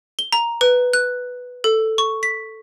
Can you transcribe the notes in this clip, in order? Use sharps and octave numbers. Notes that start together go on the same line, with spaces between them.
G7
A#5
B4
F#6
A4
C#6
B6